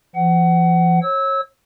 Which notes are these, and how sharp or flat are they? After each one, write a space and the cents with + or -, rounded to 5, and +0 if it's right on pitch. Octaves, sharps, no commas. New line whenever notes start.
F3 -35 F#5 +25
C#5 -30 E6 -20